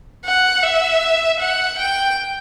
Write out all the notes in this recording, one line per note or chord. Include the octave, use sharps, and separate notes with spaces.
F#5
E5
F#5
G5